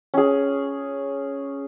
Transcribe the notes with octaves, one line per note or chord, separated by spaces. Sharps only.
C#4 G#4